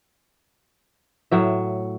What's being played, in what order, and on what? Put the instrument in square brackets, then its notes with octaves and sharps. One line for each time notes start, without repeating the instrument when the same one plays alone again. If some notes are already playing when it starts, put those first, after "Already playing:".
[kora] A2 F#3 E5